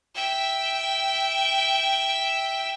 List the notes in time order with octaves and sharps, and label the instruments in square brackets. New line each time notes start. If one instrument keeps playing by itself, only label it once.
[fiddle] E5 G5